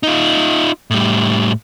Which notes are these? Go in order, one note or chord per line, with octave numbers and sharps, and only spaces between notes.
D#4 F4
A2 G3